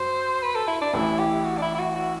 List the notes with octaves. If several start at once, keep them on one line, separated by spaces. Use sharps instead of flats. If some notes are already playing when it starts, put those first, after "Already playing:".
Already playing: F#2 F#3 C5
B4
A4
E4
D4
A1 A2 E3 E4
G4
F#4
D4
E4
E4
F#4
F#4